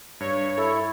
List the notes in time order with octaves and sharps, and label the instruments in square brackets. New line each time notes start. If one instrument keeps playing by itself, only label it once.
[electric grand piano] G2 [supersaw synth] C#5
[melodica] E4 [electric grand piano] A4